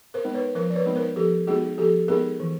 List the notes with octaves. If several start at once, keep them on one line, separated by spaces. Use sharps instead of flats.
A#4 C5
G#3 B3 D#4
B4 C#5
F3 A#4 C5
D5
B4 C#5
G#3 B3 D#4
A#4 C5
F3 G4 A4
G#3 B3 D#4 F#4 G#4
F3 G4 A4
G#3 B3 D#4 G#4 A#4
E3